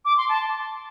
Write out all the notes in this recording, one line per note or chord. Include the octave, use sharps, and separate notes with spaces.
D6
C6
A5